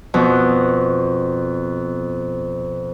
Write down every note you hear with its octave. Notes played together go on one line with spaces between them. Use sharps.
F2 B2